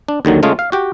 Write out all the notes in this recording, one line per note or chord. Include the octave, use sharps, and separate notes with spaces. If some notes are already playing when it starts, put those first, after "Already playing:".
D4
D#2 D3 D#3 F#3
C#3 G#3 A3 C#4 F4 G#4
F5
F#4 G4 G5